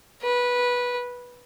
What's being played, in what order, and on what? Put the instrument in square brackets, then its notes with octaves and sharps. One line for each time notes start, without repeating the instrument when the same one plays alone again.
[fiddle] B4